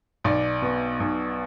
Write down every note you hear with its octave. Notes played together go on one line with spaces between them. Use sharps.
B1 D5
B2
B1